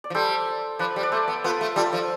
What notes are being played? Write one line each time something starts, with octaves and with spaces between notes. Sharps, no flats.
D5
F3
G3 A4 C5
F3 B4 D5
G3
D5
A3 A4 C5
B3
B3 F4 A4
A3
G3 F4 A4
F3